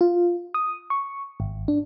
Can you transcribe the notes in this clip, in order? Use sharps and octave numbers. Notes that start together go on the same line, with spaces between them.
F4
D#6
C#6
G#1
D4